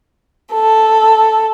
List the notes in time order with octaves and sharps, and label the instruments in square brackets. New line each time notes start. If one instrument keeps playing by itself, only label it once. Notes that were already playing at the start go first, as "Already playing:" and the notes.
[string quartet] A4